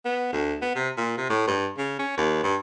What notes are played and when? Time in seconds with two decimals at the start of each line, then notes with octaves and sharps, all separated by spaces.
0.05 B3
0.33 D2
0.62 B3
0.75 C3
0.97 A#2
1.17 C3
1.29 A2
1.47 G2
1.78 C#3
1.99 C#4
2.17 D#2
2.43 G2